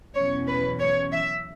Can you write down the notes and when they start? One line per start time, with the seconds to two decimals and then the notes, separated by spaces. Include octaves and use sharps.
0.15 E2 B2 F#3 C#4 C#5
0.47 B4
0.79 C#5
1.12 E5